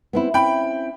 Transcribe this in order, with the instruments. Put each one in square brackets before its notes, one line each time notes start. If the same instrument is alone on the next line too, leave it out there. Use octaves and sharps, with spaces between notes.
[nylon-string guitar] B3 C4 E4
[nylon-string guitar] C4 C#4 E4 [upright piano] G5 B5